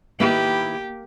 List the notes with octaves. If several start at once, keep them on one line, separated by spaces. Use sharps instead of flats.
D#3 A#3 E4 G4 B4